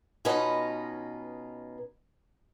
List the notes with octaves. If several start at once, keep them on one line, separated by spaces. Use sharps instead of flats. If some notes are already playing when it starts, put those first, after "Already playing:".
B2 C#4 D#4 F4 B4 D#5